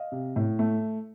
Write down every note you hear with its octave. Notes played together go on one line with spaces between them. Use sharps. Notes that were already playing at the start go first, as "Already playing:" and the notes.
Already playing: D#5 F5
C3
A2
A3